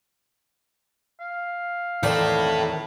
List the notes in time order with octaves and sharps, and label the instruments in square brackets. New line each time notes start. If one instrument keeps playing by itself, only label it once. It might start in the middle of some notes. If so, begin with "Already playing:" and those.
[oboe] F5
[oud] E2 D#3 C4 [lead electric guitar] E4 A4 [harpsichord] D5 E5